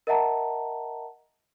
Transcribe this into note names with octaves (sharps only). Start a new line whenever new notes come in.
A#4 D#5 E5 F#5 A5 A#5